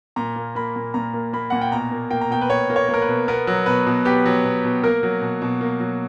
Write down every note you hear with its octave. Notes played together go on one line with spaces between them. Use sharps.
A#2 A#5
A#3
A#3 B5
A#2
A#2 A#5
A#3
A#3 B5
A#2 F#5
G5
B2 A#5
A#3
A#3 G5
A#5
B2 G5
B4
B2 C#5
A#3
C#5
A#3
A#4
B4
B2
B3 A#4
F#3
B2 B4
B2
B3 G4
F#3
B2
B2
A#3 A#4
F#3
B2
B2
A#3
F#3